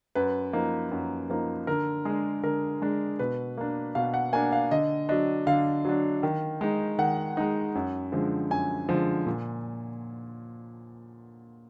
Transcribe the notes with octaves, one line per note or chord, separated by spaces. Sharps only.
F#2 B4
F3 A#3 D#4
F#2
F3 A#3 D#4
D3 A#4
G#3 D4 G#4
D3 A#4
G#3 D4
B2 B4
A#3 D4
B2 F5
F#5
A#3 D4 G#5
F5
D3 D#5
F#3 D4 D#5
D3 F5
F#3 D4
D#3
G#3 D#4
D#3 F#5
G#3 D#4
F#2
D3 F3 G#3
F#2 G#5
D3 F3 G#3
A#2